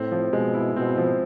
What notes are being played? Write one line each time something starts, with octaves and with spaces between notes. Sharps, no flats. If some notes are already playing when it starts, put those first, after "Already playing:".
Already playing: A2 C4
F3
B2 G#3
E4
B2 C4
F3